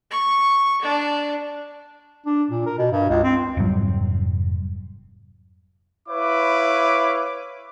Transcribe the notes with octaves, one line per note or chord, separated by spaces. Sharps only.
C#6
D4
D4
A#2
A#4
B2
G2
C#2
C4
F1 G#2 F#3 G3
E4 B4 C#5 F5 D6